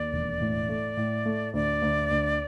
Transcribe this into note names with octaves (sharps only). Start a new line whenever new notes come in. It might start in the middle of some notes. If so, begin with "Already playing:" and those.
Already playing: D#2 D5
E1
A2
A3
A2
A3
D2 D5
D2
D2